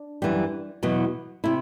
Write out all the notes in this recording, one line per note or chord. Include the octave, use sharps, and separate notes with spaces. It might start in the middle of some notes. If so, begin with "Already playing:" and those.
Already playing: D4
F#2 E3 G3
E2 B2 F#3
C3 E4